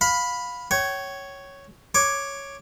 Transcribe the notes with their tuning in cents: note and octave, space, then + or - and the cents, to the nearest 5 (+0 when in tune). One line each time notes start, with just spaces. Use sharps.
F5 +20 B5 +0
C#5 +0 G5 -40
C#5 +0 D6 +5